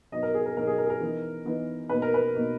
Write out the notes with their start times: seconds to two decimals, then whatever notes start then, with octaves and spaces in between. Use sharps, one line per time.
0.12 B2 F#3 B3 D#4 D#5
0.23 A#4
0.34 G#4
0.46 A#4
0.57 B2 F#3 B3 D#4 A#4
0.67 G#4
0.78 A#4
0.86 G#4
0.90 A#4
1.00 E3 B3 D#4
1.45 E3 B3 D#4
1.89 B2 A#3 D#4 B4
2.02 A#4
2.14 B4
2.35 B2 A#3 D#4